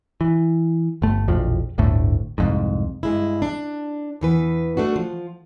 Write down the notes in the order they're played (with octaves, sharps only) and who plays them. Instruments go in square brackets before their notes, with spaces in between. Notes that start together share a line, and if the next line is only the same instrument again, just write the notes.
[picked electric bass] E3
G1 A3
E1 A#1 F2 F3
G1 D2 A2 D3
C2 F2 G#2
[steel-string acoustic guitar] G2 G#3 E4
D4
E2 E3 B4
A3 D4 F#4
F3